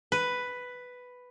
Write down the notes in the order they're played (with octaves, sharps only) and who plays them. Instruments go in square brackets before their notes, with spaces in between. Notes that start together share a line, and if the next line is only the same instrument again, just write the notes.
[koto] B4